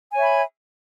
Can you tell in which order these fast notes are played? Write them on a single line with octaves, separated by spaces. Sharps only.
G#5 C#5 E5 B5